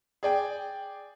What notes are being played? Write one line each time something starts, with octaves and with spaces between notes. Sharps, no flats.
G#4 D5 G5